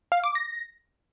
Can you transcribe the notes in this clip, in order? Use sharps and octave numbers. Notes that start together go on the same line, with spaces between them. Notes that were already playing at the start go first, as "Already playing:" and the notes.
F5
D6
A#6